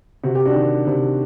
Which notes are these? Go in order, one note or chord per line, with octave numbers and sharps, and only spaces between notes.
C3 F#4
G4
D4 F#4
D#3
C3